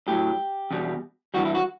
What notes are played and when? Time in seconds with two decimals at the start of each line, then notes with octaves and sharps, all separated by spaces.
0.08 A2 F#3 G4
0.71 E2 B2 G3
1.34 G2 E3 G3 F#4
1.45 E4
1.55 F#4